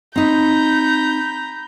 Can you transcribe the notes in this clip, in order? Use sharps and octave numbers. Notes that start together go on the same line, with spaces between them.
C4 D#4 A#5 B5 G6